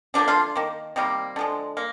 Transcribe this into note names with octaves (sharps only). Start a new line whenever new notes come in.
D3 F3 A#3 D4
F3 F4
D#3 A#3
C3 D#3 G3 A#3
D3 F3 G#3
A#3